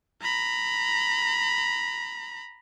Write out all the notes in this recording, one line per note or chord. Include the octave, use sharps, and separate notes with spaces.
A#5 B5